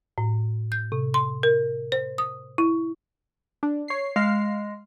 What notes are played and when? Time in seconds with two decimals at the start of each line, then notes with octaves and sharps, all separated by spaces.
0.18 A2
0.72 G6
0.92 C3
1.14 C6
1.43 A#4
1.92 C5
2.18 D#6
2.58 E4
3.63 D4
3.88 C#5 C7
4.16 G#3 F5 F6 C7